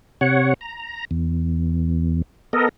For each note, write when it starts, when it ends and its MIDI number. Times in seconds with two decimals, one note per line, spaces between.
0.21 0.54 48
0.21 0.54 73
0.21 0.54 78
0.61 1.05 82
1.11 2.22 40
2.53 2.69 59
2.53 2.69 69
2.53 2.69 70
2.53 2.69 75